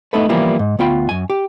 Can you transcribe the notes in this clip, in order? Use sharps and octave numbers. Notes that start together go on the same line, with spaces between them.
A3 B3 D#4 E4 A4 B4
E3 F3 G3 A#3 B3 E4
G#2
D2 B3 F4 G5 B5
F#2 G#5
G4